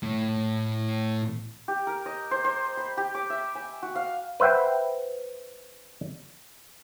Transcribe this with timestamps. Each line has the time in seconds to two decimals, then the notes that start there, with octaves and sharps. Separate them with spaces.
0.03 A2
1.68 G4
1.87 A#4
2.06 D#5
2.31 C5
2.44 C5
2.77 B5
2.97 G4
3.15 D6
3.30 E5
3.55 G#5
3.83 F#4
3.95 F5
4.40 B4 C5 E5 F#5 G5